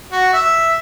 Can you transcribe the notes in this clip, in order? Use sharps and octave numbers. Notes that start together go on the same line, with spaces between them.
F#4
E5